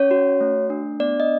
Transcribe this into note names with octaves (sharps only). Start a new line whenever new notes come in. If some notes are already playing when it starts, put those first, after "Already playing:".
Already playing: C#4 C#5
F#4
A3
D4
B3 D5
D#5